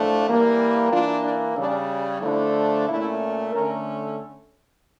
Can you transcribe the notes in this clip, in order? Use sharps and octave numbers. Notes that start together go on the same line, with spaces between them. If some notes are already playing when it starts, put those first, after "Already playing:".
Already playing: A2 F3 A3 D4
E3 G3 A#3
E3 A#3 D4 F4
D4
C#3 G3 C#4 D4
D3 F3 A3 D4 E4
A#2 A3 C#4 E4
D3 A3 C#4 A#4